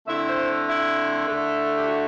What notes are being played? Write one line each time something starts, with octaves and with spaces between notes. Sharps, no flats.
D3 A3 C4 E4 E5
C5
E4
D3 A3 E4
G4
F#4